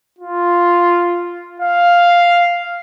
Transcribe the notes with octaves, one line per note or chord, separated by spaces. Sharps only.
F4
F5